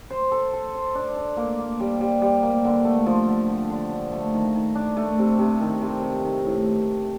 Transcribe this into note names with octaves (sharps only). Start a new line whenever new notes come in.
C5
A4
A4
C5
D4
D4
A#3
A#3
G3
G3
G3
A#3
D3
A3
F3
D3
F3
D3
D4
A3
D#3
D#3
D4
A3
C3
C3
D#3
C3
C3
D#3
A2